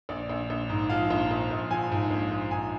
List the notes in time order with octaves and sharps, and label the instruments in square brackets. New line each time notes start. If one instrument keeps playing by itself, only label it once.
[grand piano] A#1 D5
A#1
A#1
G#2
F3 F5
A#1
A#1
A#1
F3 G#5
G#2
A#1
A#1
G#2 G#5